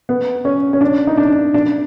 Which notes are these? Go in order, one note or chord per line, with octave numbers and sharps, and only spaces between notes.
B3
C#4
C#4
D4
D#4
D4
D4